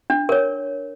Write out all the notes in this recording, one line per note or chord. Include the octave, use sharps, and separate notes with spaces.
D4
A#4 C#5